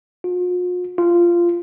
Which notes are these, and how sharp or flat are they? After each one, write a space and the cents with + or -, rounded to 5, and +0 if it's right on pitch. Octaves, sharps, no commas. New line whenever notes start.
F4 +45
F4 -15